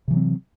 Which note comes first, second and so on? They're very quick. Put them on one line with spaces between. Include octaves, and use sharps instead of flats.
C3 E3 F#3 C4